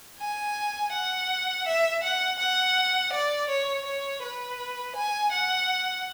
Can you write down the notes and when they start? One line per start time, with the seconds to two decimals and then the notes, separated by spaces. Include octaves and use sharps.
0.20 G#5
0.93 F#5
1.66 E5
2.03 F#5
2.38 F#5
3.13 D5
3.49 C#5
3.85 C#5
4.23 B4
4.96 G#5
5.32 F#5